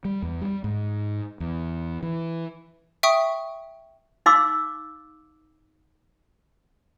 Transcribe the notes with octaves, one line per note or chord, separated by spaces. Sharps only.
G3
E2
G3
G#2
E2
E3
E5 G5 C#6 D#6
D#4 F5 C6 D6 E6